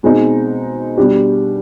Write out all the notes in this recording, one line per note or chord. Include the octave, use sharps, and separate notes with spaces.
B2 G#3 C4 D#4
B2 G3 D4 G4